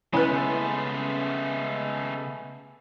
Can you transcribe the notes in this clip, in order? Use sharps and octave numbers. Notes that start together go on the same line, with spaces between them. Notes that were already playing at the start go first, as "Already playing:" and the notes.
C#3 G#3 A3 B3 C#4 E4 B4